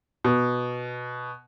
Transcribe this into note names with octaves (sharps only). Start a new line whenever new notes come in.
B2